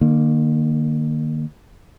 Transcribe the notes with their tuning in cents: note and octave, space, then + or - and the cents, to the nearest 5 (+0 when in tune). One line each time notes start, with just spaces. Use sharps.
D#3 -45 A#3 +0